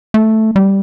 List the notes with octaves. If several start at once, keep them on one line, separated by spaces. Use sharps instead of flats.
A3
G3